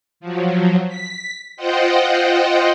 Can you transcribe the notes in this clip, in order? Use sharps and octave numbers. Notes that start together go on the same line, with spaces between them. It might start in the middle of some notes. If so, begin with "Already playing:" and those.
F3 F#3
B6
F4 C5 D#5 F#5 G5